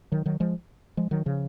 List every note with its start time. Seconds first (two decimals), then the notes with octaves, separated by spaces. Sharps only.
0.12 D#3 F#3
0.26 D#3 F#3
0.40 F3 G#3
0.97 F3 G#3
1.11 D#3 F#3
1.26 C#3 F3